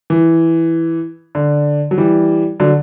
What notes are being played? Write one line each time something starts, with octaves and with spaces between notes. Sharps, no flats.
E3
D3
F#3
E3 G3
D3 F#3